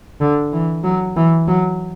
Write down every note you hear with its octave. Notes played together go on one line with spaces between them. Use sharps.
D3
E3
F#3
E3
F#3